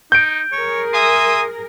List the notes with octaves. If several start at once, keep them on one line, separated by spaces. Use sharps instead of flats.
D#4 G6 D7
G#4 A#4 C#5
E5 G#5 C6 D#6